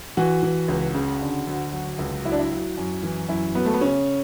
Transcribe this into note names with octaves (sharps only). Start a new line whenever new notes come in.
E3 F#4
E3
C#2
C#3
D3
D2
F#3
C#2
F#3 E4
D4
E4
F#3
F#2
E3
F#2 E4
F#3 B3
A3
B3
C#3 C#4